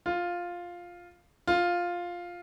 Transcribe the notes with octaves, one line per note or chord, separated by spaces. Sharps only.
F4
F4